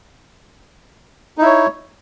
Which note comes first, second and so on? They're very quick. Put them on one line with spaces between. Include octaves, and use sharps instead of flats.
D#4 E4 C#5